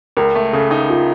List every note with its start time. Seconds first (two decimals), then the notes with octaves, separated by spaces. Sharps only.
0.17 C#2 A#4
0.35 A3
0.53 C#3 A4
0.71 D#4
0.90 F4